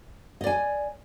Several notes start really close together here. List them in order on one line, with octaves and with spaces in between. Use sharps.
D#5 D5 G#5